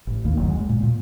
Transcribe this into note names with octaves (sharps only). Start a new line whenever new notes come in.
A1
D2 D#3 A#3
F#1 D2 F#3
G#3
A#2
A#2